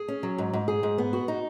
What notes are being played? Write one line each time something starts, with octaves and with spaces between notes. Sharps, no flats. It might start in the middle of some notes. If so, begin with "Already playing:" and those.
Already playing: G#4
C#4
F#3
G#2
G#2
G#4
G#2
B3
F#4
D#4